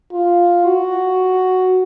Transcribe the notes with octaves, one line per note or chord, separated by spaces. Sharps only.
F4
F#4